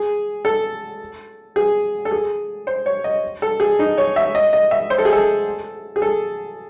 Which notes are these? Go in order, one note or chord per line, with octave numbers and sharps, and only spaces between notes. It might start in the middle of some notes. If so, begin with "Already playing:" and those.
Already playing: G#4
A4
G#4
A4
G#4
C5
C#5
D#5
A4
G#4
D#4
C#5
E5
D#5
D#5
E5
C5
A4
G#4
A4
G#4
A4